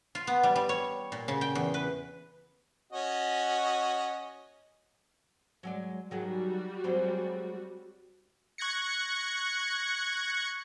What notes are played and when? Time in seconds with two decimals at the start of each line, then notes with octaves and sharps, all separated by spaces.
0.15 F4
0.27 B3
0.43 G3
0.56 G3
0.69 C#5
1.12 A#2
1.28 C#3
1.41 G5
1.55 E2
1.74 B4
2.93 C#4 F#4 D#5
5.63 F#3 G#3 D5
6.11 D#3 F#3 G3 F#4 G#4
6.84 F#3 G#3 C4
8.58 C#6 F#6 G#6 A#6 C#7